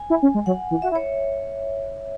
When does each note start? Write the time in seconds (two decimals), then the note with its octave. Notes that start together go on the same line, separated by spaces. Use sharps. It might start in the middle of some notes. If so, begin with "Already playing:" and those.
Already playing: G#5
0.10 E4
0.23 C#4
0.34 G#3
0.46 F#3 F#5
0.71 E3
0.82 F#4 E5
0.92 E4
0.95 C#5